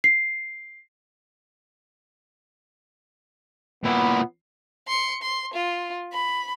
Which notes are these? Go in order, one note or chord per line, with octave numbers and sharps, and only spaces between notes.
C7
A#2 B3 E4
C6 C#7
C6
F4
B5